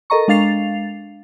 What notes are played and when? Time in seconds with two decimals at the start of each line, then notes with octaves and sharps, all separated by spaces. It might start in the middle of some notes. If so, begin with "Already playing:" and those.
0.10 A4 A#4 D#5 A#5 C#6
0.28 G#3 D4 F5 A6 C7 F7